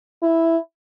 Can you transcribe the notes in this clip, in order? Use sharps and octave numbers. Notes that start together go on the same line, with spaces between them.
E4